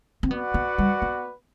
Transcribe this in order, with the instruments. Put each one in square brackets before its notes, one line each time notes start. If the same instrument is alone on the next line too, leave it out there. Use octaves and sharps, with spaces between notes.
[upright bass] C4
[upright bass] B3 [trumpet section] F#4 B4 D5 F#5
[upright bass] B3
G3
B3